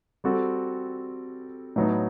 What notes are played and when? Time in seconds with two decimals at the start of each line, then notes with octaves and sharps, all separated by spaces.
0.24 G3 C4 F#4 A4
1.76 A2 F#3 B3 D#4